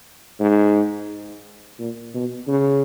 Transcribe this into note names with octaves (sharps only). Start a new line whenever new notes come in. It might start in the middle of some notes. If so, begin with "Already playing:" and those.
G#2
A#2
B2
C#3